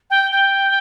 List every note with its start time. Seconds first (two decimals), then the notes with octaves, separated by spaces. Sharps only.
0.10 G5
0.32 G5